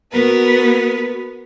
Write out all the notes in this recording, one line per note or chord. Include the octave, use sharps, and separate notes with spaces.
B3 F#4 A#4 B4